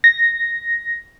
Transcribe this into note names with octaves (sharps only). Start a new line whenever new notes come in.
A#6